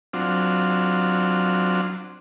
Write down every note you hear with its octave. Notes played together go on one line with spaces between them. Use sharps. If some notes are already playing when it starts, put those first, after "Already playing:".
F#3 C4 D4 F4